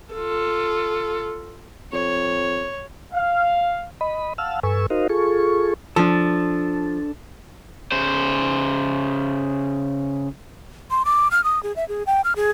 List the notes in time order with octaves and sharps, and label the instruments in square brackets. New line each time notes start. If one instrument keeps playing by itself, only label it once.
[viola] F4 A4
[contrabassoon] F2 [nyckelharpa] C#5
[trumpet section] F5
[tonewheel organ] D#5 B5
F5 F#5 A5 E6 F6
G2 A4 B4 G#5 C#6 E6
D#4 F#4 A#4 C5 D#5 F5
F4 G#4 A4 C#6
[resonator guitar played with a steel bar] F3 [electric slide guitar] D4 A4
[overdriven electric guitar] C#3 C5
[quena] C6
D6
F6
D#6
G#4
E5
G#4
G5
F6
G#4